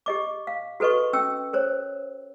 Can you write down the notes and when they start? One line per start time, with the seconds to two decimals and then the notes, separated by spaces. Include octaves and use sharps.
0.06 G4 D#5 D6
0.47 F5
0.80 F#4 A4 B4 D#5 C#6
1.13 C#4 G5 E6
1.53 A#4 C5 C#5